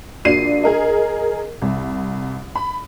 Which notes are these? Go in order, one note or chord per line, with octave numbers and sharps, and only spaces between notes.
A#1 A#3 F#4 D5 C7 D#7
G#4 A#4 D#5
C2
B5